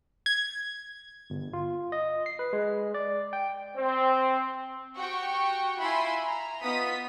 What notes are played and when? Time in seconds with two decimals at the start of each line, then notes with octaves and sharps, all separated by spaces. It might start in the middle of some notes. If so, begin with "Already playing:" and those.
0.26 G#6
1.30 G1
1.53 F4
1.92 D#5
2.26 C7
2.39 B4
2.53 G#3
2.94 D5
3.33 G5
3.76 C4
4.97 F#4 G4 G5 C#6
5.80 E4 F4 E5 G#5 B5 C6
6.26 A#5
6.63 B3 D#4 F4 D#6 B6